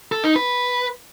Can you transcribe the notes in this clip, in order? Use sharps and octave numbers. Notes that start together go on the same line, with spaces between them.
A4
D#4
B4